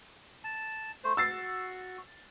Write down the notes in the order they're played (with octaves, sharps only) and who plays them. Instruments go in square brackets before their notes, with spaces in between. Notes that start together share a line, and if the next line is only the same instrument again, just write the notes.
[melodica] A5
A3 C5
[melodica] F#4 [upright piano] E6 A6 C7